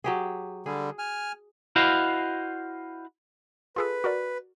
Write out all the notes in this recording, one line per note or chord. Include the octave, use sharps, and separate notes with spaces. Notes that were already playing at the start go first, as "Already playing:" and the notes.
F#3 G4 G#4
D3 G3 G#4
G#5 F6
E4 F#4 C5 D#5 F5
F4 G#4 A4 B4
F#4 A#4 D5